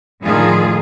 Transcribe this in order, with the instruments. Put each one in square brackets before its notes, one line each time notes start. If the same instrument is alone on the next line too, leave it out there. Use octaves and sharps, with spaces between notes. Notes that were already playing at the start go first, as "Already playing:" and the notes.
[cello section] A2 D3 D#3 F3 F4 G#4